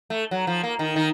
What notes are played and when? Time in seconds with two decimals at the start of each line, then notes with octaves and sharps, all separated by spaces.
0.10 A3
0.31 F#3
0.47 F3
0.63 A#3
0.79 D#3
0.96 D#3